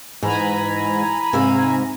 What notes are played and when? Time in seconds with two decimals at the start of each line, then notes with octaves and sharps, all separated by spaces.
0.23 G#2 E3 G#5 A#5 B5
1.33 G#2 C3 E5 F5